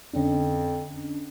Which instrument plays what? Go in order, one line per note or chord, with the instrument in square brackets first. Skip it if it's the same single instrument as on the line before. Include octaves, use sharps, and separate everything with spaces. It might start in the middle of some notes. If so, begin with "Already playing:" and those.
[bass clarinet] F2 [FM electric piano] D3 C#4 D4